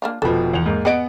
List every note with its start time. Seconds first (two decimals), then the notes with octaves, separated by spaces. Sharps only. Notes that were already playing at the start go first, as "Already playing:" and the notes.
0.02 A#3 D4 F4
0.22 F1 B2 F3 A4 B4
0.53 E2 F7
0.66 G#2 A#3
0.85 B3 G#4 D#5 F#5 D7